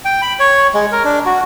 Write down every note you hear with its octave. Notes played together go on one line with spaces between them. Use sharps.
G5
B5
C#5
G#3
A#4
D4
F#4